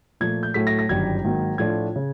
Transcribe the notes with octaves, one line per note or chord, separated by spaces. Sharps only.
A#2 F3 A3 G#6
G6
A2 F#3 A3 B6
A#6
A#6
G1 F#2 D#3 G3 G#6
G#2 D#3 F#3 A#3
A2 F3 A3 D4 F4 G#6
C#3